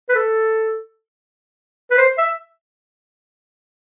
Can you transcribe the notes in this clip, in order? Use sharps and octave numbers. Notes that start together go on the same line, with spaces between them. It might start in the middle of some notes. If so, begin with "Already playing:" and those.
B4
A4
B4
C5
E5